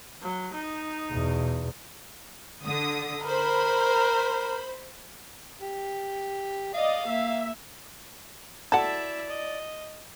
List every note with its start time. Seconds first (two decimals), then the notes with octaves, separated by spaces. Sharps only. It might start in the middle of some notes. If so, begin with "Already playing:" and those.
0.22 F#3
0.54 D#4
1.12 E2 B2
2.65 D3 D#6
3.26 A#4 C5 B5
5.61 G4
6.74 D5 D#5 F5
7.08 A#3 E5
8.72 E4 F#4 A4 D5 E5 F#5 A5
9.29 D#5